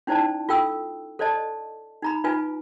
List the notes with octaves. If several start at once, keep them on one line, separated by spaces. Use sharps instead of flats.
C#4 D#4 E4 C5 D5 A5
F4 A4 G5 E6
A4 C5 D5 D#5 A5
D#4 A#5 B5
D#4 F4 B4 G#5